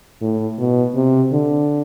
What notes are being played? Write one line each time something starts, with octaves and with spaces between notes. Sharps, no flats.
A2
B2
C3
D3